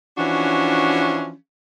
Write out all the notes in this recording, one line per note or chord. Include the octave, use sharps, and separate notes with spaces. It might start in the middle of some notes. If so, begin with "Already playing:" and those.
E3 F3 C#4 D4 F#4